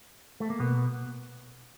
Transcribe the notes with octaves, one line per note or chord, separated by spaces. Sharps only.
A3
A#3
B2 B3